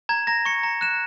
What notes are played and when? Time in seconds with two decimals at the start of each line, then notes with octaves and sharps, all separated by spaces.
0.09 A#5 G#6
0.27 A#5 A#6
0.45 C#6 C#7
0.63 A#5
0.81 F#6 E7